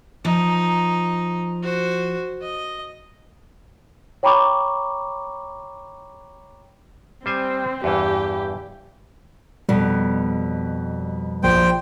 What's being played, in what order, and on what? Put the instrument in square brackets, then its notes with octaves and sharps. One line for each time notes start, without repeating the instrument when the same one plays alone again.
[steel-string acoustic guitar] F3 [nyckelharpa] D#4
[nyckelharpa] F#4 C5
D#5
[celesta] C#5 G5 A#5 B5 C#6 D6
[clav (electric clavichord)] G3 C5 G#5 [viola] C4
[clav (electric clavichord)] E2 G2 E3 [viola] G4
[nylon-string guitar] F2 B2 [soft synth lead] G3
[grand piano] A#1 [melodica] C5 G5